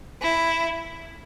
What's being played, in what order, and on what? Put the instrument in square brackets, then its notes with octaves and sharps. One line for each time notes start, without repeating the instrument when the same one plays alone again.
[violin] E4